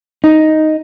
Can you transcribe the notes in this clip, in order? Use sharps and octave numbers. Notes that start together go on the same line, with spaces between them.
D#4